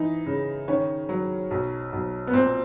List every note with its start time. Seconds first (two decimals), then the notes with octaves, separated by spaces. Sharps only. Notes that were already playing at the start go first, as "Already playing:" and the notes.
Already playing: E3 D#4
0.26 C#3
0.68 D#3 C#4
1.09 F#3
1.51 B1
1.93 B1
2.27 B3
2.33 A#2 C4